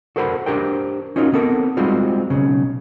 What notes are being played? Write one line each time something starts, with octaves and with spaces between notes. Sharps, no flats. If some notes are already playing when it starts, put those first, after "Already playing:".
F#4 A4 A#4 C5 F#5 B5
D4 E4 G4 A#4 C5 G5
C#4 D#4 F4 F#4 A#4
B3 C4 A4 A#4
G3 G#3 C4 D#4 F4 F#4
B1 E2 C#3